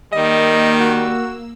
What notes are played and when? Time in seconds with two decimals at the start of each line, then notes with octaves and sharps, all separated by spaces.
0.13 D#3 G3 A#3 D#5 E6
0.81 F#4